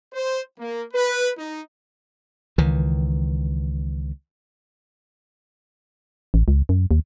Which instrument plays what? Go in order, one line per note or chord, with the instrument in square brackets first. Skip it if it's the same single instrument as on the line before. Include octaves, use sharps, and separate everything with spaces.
[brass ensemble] C5
A#3
B4
D#4
[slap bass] C#2 D#3 E3
[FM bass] A1
C#2
F#2
D#2